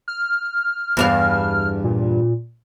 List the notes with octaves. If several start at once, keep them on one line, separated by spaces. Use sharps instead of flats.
F6
E2 G2 F5
A#2